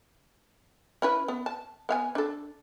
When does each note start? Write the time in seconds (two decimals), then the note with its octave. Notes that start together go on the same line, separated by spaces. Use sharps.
1.02 C#4 E4 B4
1.28 B3
1.46 A5
1.89 B3 F5 G#5
2.15 D4 A4